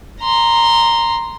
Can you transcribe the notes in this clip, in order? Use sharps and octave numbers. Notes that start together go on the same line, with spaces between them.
A#5 C6